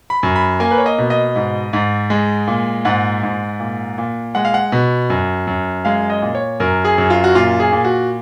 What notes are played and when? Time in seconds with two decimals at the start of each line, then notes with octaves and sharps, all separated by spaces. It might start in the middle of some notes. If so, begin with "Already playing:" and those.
0.10 B5
0.23 F#2
0.36 B5
0.60 A#3 G#5
0.71 B4
0.78 C#5
0.86 D#5
0.98 B2
1.10 D#5
1.36 G#2
1.73 G#2
2.10 G#3
2.47 A#2
2.85 G#2 F#5
3.23 G#2
3.60 A#2
3.98 A#2
4.35 G#3 F#5
4.45 F5
4.54 F#5
4.72 B2
5.10 F#2
5.47 F#2
5.85 G#3 F5
6.10 D#5
6.22 A#2
6.35 C#5
6.60 F#2 A#4
6.85 G#4
6.98 F#2
7.10 F4
7.24 F#4
7.35 A#2 F4
7.60 G#4
7.72 A#2
7.84 F#4